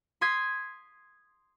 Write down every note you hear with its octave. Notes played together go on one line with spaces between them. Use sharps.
C6 D#6 G#6 B6 C7